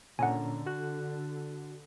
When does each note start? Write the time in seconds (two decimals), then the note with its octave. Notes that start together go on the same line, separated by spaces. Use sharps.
0.19 A#2 D3 C#4 F#5 G#5 A#5
0.66 F#4 F#6